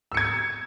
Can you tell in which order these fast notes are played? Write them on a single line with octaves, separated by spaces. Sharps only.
E6 C#7 G#6